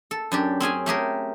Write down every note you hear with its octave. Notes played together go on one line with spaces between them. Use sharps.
A4
F#2 D4 G4
C4 C#4 G#4 G#5
A3 G4 G#4 A#4